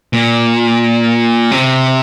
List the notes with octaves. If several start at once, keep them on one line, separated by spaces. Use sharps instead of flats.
A#2
C3